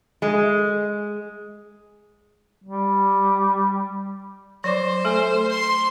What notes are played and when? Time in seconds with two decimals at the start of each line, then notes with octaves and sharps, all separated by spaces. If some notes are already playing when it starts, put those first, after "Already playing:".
0.22 G#3
2.64 G3
4.64 F#3 C5 D5 D6
5.05 A3 A4 G#5
5.51 C6